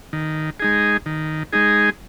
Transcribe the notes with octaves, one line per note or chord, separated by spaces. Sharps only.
D#3
G#3 D#4 G#4
D#3
G#3 D#4 G#4